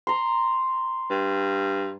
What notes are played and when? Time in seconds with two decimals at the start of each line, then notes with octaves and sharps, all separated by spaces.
0.07 A#5 C6
1.10 G2